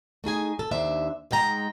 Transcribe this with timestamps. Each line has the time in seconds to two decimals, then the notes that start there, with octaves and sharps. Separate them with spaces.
0.24 A3 D#4 G#4 G#5
0.59 A4
0.71 D#2 D4 C5 E5
1.31 G#2 G#3 G5 A#5